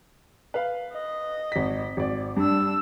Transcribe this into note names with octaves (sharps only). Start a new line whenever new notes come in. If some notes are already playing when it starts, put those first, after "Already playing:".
B4 F5
D#5
G#1 B6
G#1 D5
G2 D4 E6